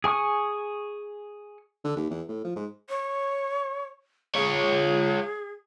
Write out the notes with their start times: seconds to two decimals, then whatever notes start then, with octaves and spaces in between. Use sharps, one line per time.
0.04 G#4 G#5 C#6 D#6
1.84 D3
1.96 D#2
2.10 E2
2.28 A2
2.44 F3
2.56 G#2
2.89 C#5
4.35 F4 G#4 C#5